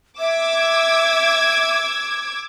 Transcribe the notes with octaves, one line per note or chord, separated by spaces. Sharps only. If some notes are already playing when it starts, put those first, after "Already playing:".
E5 D6 E6 G#6